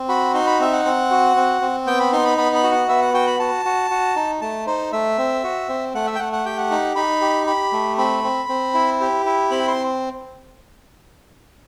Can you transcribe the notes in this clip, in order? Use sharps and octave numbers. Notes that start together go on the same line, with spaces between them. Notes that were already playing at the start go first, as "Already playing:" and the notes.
Already playing: C4
F#4 B5
D#4 C6
B5
C4 E5
F#5
C4
F#4
C4
C4
B3 G5
B5
D#4 C6
B5
B3 B5
B5
F#4
F#5
B3 E5
F#5
F#4 G5
B5
F#4 A5
F#4
F#4
D#4
A3 A5
D#4 C5
A3 E5
C4
F#4
C4
A3 F#5
E5
G5
A3 F#5
F#5
G4 G5
F#5
D#4
D#4 B5
G4
G4 B5
A3
C4 B5
C4
C4
E4
G4
E4
C4 B5
C6